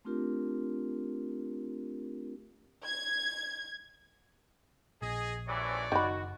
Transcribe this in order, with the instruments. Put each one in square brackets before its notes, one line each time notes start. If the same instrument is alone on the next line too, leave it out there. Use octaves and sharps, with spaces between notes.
[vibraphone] A3 C4 D4 F4 G4 A#4
[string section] G#6
[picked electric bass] A#1 [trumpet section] G#4 D#5
[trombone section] G#1 C3 E3 [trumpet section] C#5 D5
[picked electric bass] F#1 [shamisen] D#3 B5 [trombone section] F#4